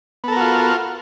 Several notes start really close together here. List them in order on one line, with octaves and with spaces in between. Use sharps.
B3 A4 A#4 F#4 F4